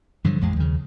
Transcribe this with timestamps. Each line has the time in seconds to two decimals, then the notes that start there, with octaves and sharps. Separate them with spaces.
0.24 G2 D3 F3 F#3
0.41 A1 F2 G#3
0.56 D#2 C#3